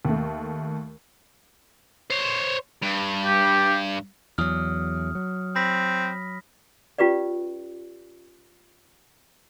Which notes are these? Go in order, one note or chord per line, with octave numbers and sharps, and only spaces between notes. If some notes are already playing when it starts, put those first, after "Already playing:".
D#2 A3
C5 C#5
G2
G4
E2 F#3 D#6 F6
F#3
C4 B5 A#6 B6
C#4 F4 G4 B4 D5